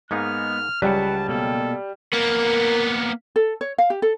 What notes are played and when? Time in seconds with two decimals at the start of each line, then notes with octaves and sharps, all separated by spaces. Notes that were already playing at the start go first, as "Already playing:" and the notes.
0.11 G#2 G#3 A#3 B3 D#4 F6
0.82 C#2 F#3 G3 B4 F#5 A5
1.29 B2 A#3 A4
2.13 A#3 B3 A#4
3.36 A4
3.61 C#5
3.78 F5
3.90 G4
4.02 A4